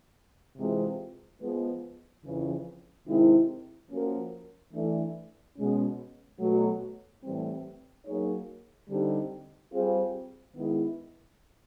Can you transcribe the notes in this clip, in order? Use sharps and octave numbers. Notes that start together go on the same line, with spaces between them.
C3 E3 G#3 C4 F4
F3 G#3 B3
F2 C#3 E3
C3 D#3 G#3 C4 E4
F3 A#3 C#4 F#4 A#4
E3 A3 D4
B2 G#3 C#4
B2 F#3 A3
A2 E3 G3 C4
F#3 A#3 D#4 G#4 C#5
D3 G3 C4 D#4 G4
G3 C4 F4 G#4
D#3 G#3 B3 E4